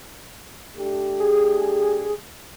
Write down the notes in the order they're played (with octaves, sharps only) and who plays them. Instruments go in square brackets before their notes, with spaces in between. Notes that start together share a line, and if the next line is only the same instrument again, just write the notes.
[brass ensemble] A3 D4 G4
[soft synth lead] G#4